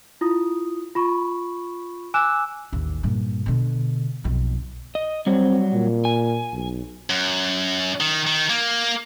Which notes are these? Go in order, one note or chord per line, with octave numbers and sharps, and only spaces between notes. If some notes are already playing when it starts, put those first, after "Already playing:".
E4 F4 D#6
F4 B5 C#6
G#5 D6 E6 F#6 E7
A1 D#2
G2 A#2
B2 D3
B1 F2
D#5
F#3 G3 C4
A#2
G#5
B1
F#2
D#3
D#3
A#3